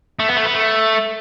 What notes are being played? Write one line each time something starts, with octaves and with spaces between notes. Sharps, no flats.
A3
B3
A3
B3
A3